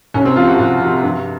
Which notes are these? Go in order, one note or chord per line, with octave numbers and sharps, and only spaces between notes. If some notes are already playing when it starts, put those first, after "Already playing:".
C2 C#4
C4
C3 F3 F4
F#4
C2 F#4
C3 F3
G2